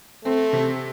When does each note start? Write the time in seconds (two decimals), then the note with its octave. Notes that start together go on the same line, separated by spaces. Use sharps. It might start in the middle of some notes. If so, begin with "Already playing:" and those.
0.24 A3 C4
0.53 C3